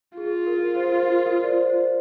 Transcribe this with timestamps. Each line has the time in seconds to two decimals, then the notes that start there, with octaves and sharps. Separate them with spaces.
0.17 F4 G#4
0.47 A#4
0.76 C5
0.85 A#4
0.93 C5
1.05 A#4
1.26 A#4
1.43 D5
1.48 C5
1.70 C5